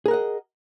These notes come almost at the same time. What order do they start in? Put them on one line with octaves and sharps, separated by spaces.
G#4 A#4 F#5 D#5